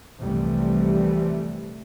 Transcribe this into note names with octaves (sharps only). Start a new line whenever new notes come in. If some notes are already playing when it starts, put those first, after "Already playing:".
C2 F2 C3 E3 G3 A3